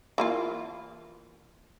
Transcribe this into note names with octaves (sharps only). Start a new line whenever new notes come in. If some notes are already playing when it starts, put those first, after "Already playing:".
E3 A#3 F4